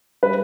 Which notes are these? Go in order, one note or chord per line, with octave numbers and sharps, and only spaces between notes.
G3 B4